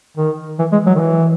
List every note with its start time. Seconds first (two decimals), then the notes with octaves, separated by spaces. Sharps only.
0.17 D#3
0.59 E3
0.72 G#3
0.86 F#3
0.95 D#3
1.00 E3